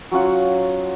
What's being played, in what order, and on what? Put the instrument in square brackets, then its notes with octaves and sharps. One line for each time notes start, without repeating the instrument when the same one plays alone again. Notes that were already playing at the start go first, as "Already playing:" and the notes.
[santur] F#3 C#4 F4 F#5